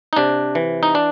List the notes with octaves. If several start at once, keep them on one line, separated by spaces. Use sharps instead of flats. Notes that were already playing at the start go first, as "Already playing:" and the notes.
D#4
C3 D4
E3
D#4
D4